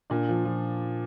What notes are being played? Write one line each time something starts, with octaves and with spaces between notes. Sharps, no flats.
A#2 D4
F3
F3